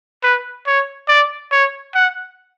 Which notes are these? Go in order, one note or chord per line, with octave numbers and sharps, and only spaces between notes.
B4
C#5
D5
C#5
F#5